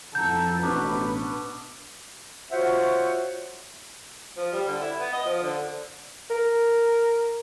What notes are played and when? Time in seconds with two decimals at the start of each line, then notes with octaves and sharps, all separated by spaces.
0.15 F2 E4 A4 F#5 A#5 G6
0.62 A1 B2 B3 D4 B4 C#6
2.51 F4 F#4 C5 C#5 E5 F#5
4.37 F3
4.53 G3
4.68 D3
4.81 E4
4.99 B3
5.13 D#5
5.25 F3
5.42 D3
6.30 A#4